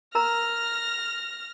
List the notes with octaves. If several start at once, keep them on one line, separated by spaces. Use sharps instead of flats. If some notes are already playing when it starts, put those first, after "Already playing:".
A#4 A#5 F6 A#6